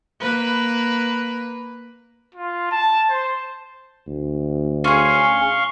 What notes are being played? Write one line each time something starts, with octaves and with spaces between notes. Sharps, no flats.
A#3 B4
F4
A5
C5
D2
C#4 G#4 F5 C6 C#6